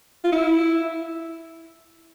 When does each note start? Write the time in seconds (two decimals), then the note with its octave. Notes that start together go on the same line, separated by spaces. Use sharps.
0.24 F4
0.32 E4